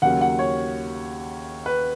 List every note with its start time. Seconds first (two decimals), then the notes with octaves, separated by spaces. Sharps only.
0.02 D#2 C#3 F#3 A#3 F#5
0.21 F#5
0.39 C#5
1.66 B4